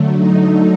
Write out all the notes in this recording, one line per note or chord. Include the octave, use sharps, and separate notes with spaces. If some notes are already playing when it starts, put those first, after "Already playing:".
Already playing: D3 F#3 A3
D#4